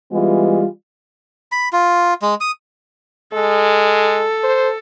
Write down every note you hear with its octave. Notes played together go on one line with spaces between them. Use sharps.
E3 G3 G#3 B3 F4
B5
F4
G#3
D#6
G#3 A4
C5